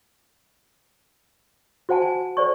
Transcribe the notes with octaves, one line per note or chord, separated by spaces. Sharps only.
F#4 C5 F#5 G#5 A5
G#5
A4 C5 D5 C#6